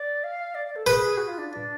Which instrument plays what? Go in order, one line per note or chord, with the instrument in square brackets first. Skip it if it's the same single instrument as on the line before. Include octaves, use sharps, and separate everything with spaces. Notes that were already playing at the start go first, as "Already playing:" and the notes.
Already playing: [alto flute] D5
F5
D5
D5
A4
[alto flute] G#4 [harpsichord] B4
[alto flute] F#4
F4
D4
D4